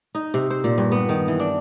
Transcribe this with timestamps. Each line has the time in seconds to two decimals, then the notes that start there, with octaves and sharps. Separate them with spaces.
0.15 D#4
0.34 C3
0.50 C5
0.64 A#2
0.78 G2
0.92 B3
1.09 D#3
1.28 E3
1.40 D4